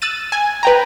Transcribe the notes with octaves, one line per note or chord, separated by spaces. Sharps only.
E6 F#6 A6 D#7
G#5
B4 G5 A#5